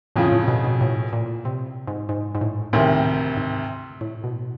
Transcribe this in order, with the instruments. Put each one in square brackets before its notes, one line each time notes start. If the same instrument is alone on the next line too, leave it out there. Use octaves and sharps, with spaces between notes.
[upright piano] F2 C#3 F3 [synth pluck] A2
[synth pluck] A2
B2
B2
A2
A#2
C3
G#2
G#2
G#2
A2
[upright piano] D2 C3 D#3 [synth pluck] A2
[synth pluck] G#2
A2
B2